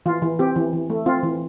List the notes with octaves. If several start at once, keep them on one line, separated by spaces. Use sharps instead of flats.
E3 F4
E3
C4 G4
E3
E3
A3
C4 F4
E3